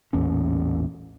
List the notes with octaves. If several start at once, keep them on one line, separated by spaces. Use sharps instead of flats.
A1 E2 A#2 C#4